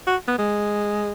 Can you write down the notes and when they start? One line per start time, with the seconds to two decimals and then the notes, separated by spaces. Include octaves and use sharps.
0.07 F#4
0.28 B3
0.39 G#3